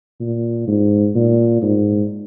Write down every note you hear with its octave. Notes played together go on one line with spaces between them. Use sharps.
A#2
G#2
A#2
G#2